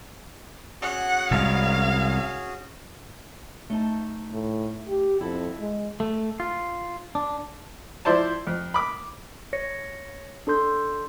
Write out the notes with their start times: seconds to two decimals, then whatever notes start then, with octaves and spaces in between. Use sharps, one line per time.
0.82 C#4 F#4 G#4 F#5
1.31 C2 G#2 F5
3.70 A3 D#4 A5
4.32 A2
4.88 G4
5.21 F2 E4 F#4 A4
5.60 G#3
6.00 A3
6.40 F4
7.15 D4
8.05 F3 E4 C5 D5 A5
8.47 F2
8.74 B5 D6
9.53 C#5 A#6 C#7
10.47 D4 A4 C6 G6